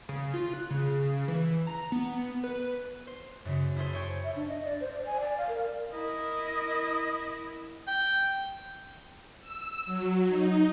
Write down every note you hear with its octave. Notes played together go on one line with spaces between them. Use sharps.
C#3
F4
F#6
C#3
E3
A#5
B3
B4
C5
F#2 C#3
E4 G#4 A4 C5
C5 C#5 G5
E5
D4
D#5
D5
C5
D5
G#5
D5
F5
A#4
E4 A#4 D#5
G5
E6
F#3
D#4